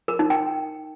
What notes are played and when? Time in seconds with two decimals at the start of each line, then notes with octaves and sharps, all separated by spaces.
0.08 A#4
0.19 D#4
0.30 G5